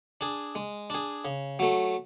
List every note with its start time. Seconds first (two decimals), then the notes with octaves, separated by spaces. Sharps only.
0.21 D4 G#4
0.55 G#3
0.90 D4 G#4
1.25 C#3
1.59 F#3 A3